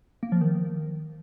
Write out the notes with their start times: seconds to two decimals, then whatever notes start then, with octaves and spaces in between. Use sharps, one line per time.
0.23 A#3
0.32 F3
0.41 D#3